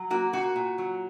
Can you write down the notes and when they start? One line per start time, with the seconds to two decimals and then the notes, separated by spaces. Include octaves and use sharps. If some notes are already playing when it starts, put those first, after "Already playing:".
Already playing: F#3
0.10 A#3 F#4
0.33 A#2 F#4
0.56 A#2
0.78 F#3